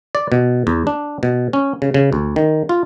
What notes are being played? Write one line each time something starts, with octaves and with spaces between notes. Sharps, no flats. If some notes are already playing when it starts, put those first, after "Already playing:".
D5
B2
E2
D4
B2
C#4
C#3
C#3
D2
D#3
F4